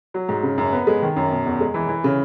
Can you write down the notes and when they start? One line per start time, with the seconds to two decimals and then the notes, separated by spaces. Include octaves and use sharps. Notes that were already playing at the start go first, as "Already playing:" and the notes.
0.14 F#3
0.29 G#2
0.43 C#3
0.58 F#2
0.73 B3
0.87 G#3
1.02 D#3
1.16 F#2
1.31 B2
1.45 E2
1.60 G#3
1.74 E3
1.89 E3
2.04 C#3